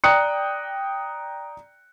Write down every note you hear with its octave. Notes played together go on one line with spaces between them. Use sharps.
D5 G5 A#5 D#6 F#6 C#7